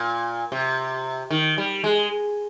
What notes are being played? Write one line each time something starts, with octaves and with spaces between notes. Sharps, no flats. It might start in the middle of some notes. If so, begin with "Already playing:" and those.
Already playing: A#2
C3
D#3
G3
G#3